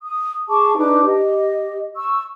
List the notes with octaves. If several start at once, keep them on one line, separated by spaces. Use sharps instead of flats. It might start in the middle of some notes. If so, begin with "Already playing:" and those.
D#6
G#4 A5 C#6 D6
D4 D#4 B4 D6
G4 D#5
C#6 E6